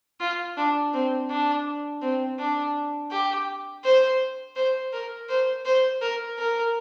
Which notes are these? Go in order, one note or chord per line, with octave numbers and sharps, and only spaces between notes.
F4
D4
C4
D4
C4
D4
G4
C5
C5
A#4
C5
C5
A#4
A#4